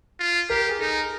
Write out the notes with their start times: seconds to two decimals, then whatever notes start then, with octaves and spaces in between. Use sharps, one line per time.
0.20 F4
0.50 G4 A#4
0.69 G#4
0.80 D#4 A4